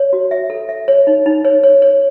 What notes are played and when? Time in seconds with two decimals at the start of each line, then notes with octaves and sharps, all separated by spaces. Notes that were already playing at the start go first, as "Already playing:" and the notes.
Already playing: C#5
0.13 F#4
0.31 E5
0.50 A4
0.69 E5
0.88 C#5
1.07 D#4
1.26 D#4
1.45 C#5
1.63 C#5
1.82 C#5